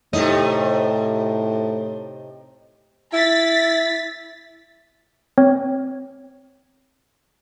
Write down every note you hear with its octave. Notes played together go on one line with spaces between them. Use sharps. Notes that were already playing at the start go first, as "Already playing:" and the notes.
A2 C3 A3 D#4 D#5
E4 A6 B6
C4 C#5